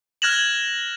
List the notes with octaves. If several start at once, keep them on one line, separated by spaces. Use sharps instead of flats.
F6 F#6 G#6 A#6 E7 F#7